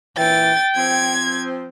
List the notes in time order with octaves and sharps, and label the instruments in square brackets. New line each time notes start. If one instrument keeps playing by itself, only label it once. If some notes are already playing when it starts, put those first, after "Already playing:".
[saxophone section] A#2 E3 [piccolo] G5 [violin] A6
[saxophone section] F3 C4 [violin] G#6